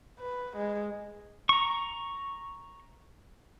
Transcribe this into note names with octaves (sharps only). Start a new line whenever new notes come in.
B4
G#3
A#5 C#6